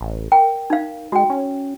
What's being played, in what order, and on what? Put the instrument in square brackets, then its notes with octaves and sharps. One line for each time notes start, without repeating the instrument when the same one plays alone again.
[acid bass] A1
[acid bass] A#4 [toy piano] G5
[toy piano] D#4 F5
[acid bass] G#3 [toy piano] F#4 G5
[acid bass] C#4